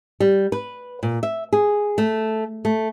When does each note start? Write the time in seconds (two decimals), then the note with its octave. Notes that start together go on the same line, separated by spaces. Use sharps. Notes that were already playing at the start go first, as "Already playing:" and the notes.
0.20 G3
0.52 B4
1.03 A#2
1.23 E5
1.53 G#4
1.98 A3
2.65 A3